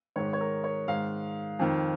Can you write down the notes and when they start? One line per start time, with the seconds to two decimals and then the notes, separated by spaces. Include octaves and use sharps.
0.16 G#2 D#3 C#5
0.33 C#5
0.40 A#4
0.64 C#5
0.88 G#2 D#3 F5
1.59 F2 D#3